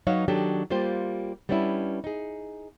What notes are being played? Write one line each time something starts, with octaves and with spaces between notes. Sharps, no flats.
F#3 D#4 B4 C#5 F5
D#3 F#3 D4 G4 A4
G3 A#3 F4 G4 C5
G3 B3 C#4 D4 E4
D#4 G#4